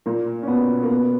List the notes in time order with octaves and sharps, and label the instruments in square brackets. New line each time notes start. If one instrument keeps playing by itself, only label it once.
[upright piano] A#2 A#3
C#4
B2 B3
A#3
B2 B3